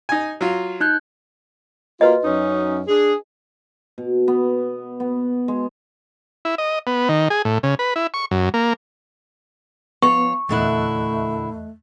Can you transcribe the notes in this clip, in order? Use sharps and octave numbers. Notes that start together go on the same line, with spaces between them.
D#4 G#5
F#3 F4
D#4 F#6 G6
A#3 F4 F#4 B4 D#5
F#2 C#4 D#4
D4 G#4
B2
B3
B3
G#3
E4
D#5
B3
D#3
G#4
A2
C#3
B4
E4
C#6
F#2
A#3
F3 B3 C#5 C#6
E2 A#2 D3 A3 E4 D#5 F#6